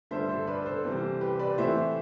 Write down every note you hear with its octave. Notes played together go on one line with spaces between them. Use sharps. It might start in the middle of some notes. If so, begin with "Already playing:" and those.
G2 D3 A3 D4 C5 E5
A4 C5
B4 D5
A4 C5
C2 C3 E3 G3 C4
G4 B4
B4 D5
A2 E3 A3 C4 C5 E5